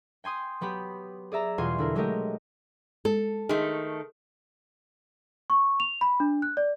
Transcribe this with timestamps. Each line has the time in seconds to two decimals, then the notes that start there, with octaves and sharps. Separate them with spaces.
0.24 G5 G#5 C6 D#6
0.61 F#3 B3 G4 B5
1.32 G#4 D5 E5 A#5
1.58 E2 B2 G3 F4 G#5 C6
1.78 D3 E4 A#4
1.95 F#3 G#3 A3 G4 A#4 D#5
3.05 G#3 A4
3.49 D#3 A3 G#4 C6
5.50 C#6
5.80 F7
6.01 B5
6.20 D4
6.42 F#6
6.57 D5